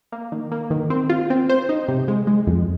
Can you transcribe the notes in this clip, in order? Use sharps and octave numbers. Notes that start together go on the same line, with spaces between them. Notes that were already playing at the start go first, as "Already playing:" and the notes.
A#3
D#3
A#3
D#3
C4
F4
C4
C5
D#4
C3
G#3
G#3
F2